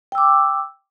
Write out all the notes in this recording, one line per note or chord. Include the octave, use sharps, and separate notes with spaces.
G5 D6 E6